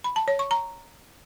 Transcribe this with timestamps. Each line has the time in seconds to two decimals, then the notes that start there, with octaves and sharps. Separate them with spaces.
0.04 B5
0.16 A5
0.28 C#5
0.39 C#6
0.51 A#5